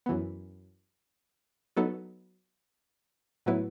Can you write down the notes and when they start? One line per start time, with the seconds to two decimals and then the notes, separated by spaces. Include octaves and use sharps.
0.06 F#2 E3 B3
1.76 F#3 B3 D#4 A4
3.46 A2 F#3 B3 E4 B4